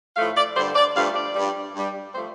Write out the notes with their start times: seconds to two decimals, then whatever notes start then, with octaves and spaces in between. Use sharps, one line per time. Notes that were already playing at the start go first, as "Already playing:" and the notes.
0.16 A2 F3 A3 F5
0.36 D5
0.55 G2 D3 G3 C5
0.75 D5
0.95 G2 F3 A3 F5
1.16 D5
1.36 G2 G3
1.75 G2 G3
2.14 F3 A3 C5